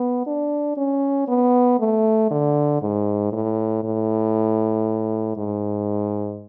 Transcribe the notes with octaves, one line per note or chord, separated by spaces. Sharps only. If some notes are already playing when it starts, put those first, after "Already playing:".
Already playing: B3
D4
C#4
B3
A3
D3
G#2
A2
A2
G#2